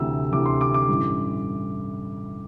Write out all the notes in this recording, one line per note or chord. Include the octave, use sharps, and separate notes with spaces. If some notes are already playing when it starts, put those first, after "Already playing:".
Already playing: D2 C3 E3 E6
D2 C3 E3 D6
C6
D6
D6
A1 G2 E3